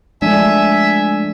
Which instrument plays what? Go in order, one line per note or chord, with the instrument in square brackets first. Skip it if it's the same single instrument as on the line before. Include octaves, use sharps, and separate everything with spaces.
[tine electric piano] F3 D4 [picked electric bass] G#3 A3 [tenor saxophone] E5 [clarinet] G#5